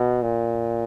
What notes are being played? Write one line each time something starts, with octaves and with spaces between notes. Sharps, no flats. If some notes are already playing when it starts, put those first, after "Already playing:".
Already playing: B2
A#2